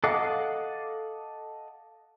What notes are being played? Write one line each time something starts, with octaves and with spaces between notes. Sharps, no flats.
A4 D#5 F5 F#5 D6